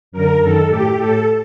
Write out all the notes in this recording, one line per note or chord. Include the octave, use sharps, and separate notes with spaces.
F#2 D3 A#4
F#2 D#3 A4
A2 G4
A2 A4